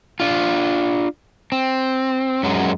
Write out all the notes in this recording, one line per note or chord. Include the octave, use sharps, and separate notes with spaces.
D4 F4
C4
F#2 F#3 G#3